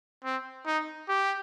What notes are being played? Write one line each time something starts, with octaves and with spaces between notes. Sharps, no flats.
C4
D#4
G4